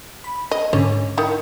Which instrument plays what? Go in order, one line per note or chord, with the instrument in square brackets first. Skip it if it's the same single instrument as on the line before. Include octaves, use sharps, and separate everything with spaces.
[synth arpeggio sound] B5
[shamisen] D#5
[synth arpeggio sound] G#2 D3 [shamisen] C#4 C#5
[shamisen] D#3 E4